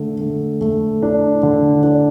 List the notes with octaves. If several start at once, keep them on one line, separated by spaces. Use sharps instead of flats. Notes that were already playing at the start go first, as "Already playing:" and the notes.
Already playing: D3 A3
A3
A3
D4
D3
D4